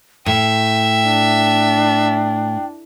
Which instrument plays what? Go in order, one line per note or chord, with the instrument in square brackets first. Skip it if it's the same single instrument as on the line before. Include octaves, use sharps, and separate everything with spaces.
[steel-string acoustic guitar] A2 [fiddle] E5 [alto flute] G5
[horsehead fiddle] D4